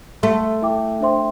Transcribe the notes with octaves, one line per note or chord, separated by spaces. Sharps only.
A3 A4 E5 C6
E4 A4 E5 G5 D6
D4 C5 E5 G5 C6